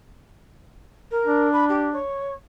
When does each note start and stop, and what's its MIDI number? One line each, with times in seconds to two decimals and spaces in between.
1.11 1.51 70
1.26 1.99 62
1.52 1.65 83
1.69 1.90 67
1.93 2.33 73